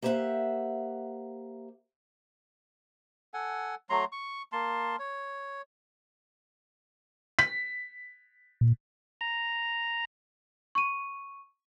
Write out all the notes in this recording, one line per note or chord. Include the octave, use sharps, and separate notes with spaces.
A#3 G4 C5 D5 E5 F#5
A4 F#5 G#5
F#3 A3 A#5 C6
C#6
A#3 A5 C6
C#5
B6
A#2
A#5
C#6 D#7